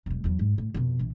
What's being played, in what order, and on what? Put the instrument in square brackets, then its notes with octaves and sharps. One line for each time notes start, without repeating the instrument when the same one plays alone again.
[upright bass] E1 G3
E2 F#3
G#2
A2
F2 B2
A#1 E3